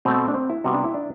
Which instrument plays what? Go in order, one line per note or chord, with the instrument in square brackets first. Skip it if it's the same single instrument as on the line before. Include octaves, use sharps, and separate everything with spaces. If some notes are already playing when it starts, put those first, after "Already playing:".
[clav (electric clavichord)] B2 A3 C4
D4
C4
E4
C3 G3 B3 F#4
D4
E4
D4